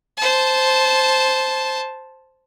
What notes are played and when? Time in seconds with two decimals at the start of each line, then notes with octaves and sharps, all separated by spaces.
0.17 C5 A5